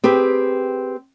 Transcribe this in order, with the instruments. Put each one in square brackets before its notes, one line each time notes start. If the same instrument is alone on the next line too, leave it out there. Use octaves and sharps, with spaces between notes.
[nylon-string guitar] C4 G4 G#4 B4